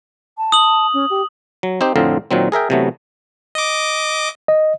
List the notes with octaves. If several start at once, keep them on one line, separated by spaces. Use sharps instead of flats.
A5
D#6 F#7
C#4
G4
F#3
C4 D#4 G4 C5
F2 A2 D3 C4 F5 A#5
A#2 D#3 F#3 C4
G#4 A#4 E5 G5
C3 E3 F#3 A3 B3
D#5 D6
D#5